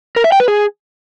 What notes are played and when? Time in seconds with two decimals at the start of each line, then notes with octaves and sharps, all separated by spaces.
0.16 A#4
0.24 E5
0.32 G5
0.40 B4
0.48 G#4